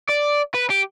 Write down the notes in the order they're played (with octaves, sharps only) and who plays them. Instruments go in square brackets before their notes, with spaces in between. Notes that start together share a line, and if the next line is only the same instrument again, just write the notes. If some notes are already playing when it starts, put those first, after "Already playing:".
[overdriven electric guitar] D5
B4
G4